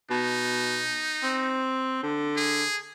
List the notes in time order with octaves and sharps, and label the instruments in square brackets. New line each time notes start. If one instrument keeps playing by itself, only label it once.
[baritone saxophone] B2 [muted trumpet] D#4
[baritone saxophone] C4
D3
[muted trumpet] G#4